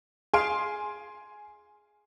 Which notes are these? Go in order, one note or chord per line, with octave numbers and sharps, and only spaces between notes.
G#4 F5 G#5 C6 D7